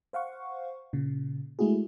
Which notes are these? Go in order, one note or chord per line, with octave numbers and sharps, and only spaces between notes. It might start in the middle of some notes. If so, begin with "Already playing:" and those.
C5 F5 F#5 C#6
A#2 C#3
G#3 A3 E4 F#4 G#4